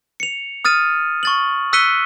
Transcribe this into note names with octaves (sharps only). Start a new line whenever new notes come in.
C#7 F7
D#6 F6 A6 D#7
C#6 A6 F#7
E6 F#6 B6 C#7 D#7 G7